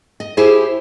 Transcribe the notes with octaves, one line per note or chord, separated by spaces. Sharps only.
D#5
E4 G4 G#4 C5